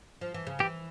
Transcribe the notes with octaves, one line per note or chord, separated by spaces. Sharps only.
F3
E3
C#3
E3 G4